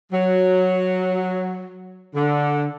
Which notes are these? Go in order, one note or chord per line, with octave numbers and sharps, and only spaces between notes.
F#3
D3